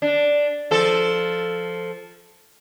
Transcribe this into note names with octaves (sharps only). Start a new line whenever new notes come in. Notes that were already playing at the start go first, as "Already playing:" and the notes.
D4
F3 A4